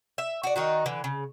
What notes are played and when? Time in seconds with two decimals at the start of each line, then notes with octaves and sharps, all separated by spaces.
0.18 E5
0.43 F#4 D5
0.56 D#3 D#4 F#4
0.86 D3 E3
1.04 C#3